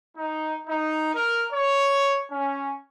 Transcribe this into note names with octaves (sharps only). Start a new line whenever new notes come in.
D#4
D#4
A#4
C#5
C#4